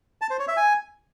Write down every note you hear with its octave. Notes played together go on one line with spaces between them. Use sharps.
A5
C5
C#5
E5
G#5